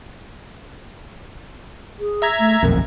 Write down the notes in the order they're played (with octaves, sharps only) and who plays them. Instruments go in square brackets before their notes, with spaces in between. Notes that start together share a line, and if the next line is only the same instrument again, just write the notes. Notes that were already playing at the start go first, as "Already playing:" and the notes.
[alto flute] G#4
[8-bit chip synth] E5 A#5 G#6
[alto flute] A3
[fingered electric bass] D#1 B1 F2 [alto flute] A#4